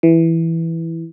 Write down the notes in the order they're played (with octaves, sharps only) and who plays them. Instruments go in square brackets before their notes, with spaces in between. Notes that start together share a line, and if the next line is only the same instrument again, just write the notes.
[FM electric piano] E3